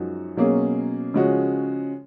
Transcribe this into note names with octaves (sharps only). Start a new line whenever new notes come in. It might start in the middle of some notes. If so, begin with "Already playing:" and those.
Already playing: F#2 F3 G#3 D#4 F#4
B2 F#3 A#3 C#4 G#4
C#3 F3 G#3 C#4 F#4